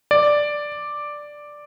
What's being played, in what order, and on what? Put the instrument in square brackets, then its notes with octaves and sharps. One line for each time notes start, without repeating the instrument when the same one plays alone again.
[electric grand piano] D5